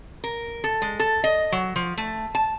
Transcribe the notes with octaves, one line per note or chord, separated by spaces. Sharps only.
A#4
A4
G#3
A4
D#5
F#3
F3
A3
A5